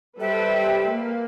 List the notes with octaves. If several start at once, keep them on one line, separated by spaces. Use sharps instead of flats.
G3 A4 B4 C5 E5 G5
A#3